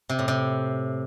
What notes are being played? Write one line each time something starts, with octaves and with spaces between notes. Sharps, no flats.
C3
A2
C3